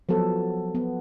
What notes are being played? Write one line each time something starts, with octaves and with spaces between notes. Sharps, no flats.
F3 F#3 B3 A4
B3